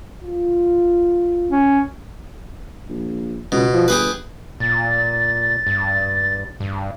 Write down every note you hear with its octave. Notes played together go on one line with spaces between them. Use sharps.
F4
C#4
A#1
C#2 B2
F3
G1 G4 G#4 B4
A#2 A6
G2
G2